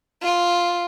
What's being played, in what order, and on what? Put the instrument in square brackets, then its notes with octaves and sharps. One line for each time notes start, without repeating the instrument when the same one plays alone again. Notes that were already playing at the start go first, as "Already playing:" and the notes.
[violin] F4